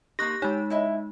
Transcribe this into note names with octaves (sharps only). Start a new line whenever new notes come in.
A#3 D#4 G4 C#6 F#6 A#6
G#3 D#4 G4 C#5
E4 D#5 E5